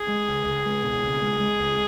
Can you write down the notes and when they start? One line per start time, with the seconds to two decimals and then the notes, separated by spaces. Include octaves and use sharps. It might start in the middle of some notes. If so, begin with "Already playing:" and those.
Already playing: G#4
0.08 G#3
0.28 C#2
0.46 C#2
0.66 G#3
0.83 B2
1.03 C#2
1.22 G#3
1.40 G#3
1.60 C#2